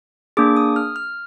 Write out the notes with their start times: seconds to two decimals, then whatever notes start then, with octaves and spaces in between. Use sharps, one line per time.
0.37 A#3 D4 G#4 D6
0.56 D#6
0.76 F6
0.96 F6